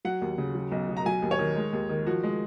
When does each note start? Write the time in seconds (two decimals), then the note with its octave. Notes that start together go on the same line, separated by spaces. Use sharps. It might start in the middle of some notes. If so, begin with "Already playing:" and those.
0.05 F#3 F#5
0.22 D#2
0.38 C#3
0.55 F#3
0.72 B1
0.89 B2
0.97 A#5
1.06 F#3 G#5
1.22 D#2
1.31 C#5
1.39 D#3
1.56 G#3
1.73 D#2
1.89 D#3
2.07 F3 F#4
2.23 G#3